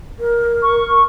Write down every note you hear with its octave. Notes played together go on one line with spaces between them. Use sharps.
A#4
C#6